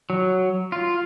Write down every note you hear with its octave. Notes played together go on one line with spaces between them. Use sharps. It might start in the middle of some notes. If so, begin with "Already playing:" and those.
F#3
F4